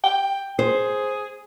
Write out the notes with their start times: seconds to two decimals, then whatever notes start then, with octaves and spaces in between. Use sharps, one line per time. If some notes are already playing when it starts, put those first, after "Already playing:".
0.04 G5
0.59 G#4 C5